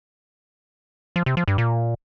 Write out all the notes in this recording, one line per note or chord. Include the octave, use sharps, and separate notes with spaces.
F3
C3
F3
G2
A#2